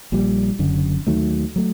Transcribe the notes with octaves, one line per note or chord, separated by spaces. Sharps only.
A#1 A#2 G3
F#1 F#2 D3
D#2 D#3 F#3 A3
F#3 A3